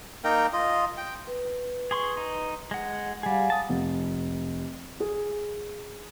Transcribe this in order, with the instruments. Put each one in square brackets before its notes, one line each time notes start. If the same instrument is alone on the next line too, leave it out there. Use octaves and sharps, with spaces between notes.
[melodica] A#3 D#4 A#4 G5
F4 D#5
G5
[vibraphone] B4
[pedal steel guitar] G#4 C6 C#6
D#4
G#3 F#5
[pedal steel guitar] G3 G#4 [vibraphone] F5 F#5 G#5
[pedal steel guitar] A5 D#6
[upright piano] F1
G#4